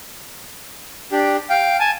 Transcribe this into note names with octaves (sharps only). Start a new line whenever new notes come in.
D4 G4
F5 G5
G#5 A5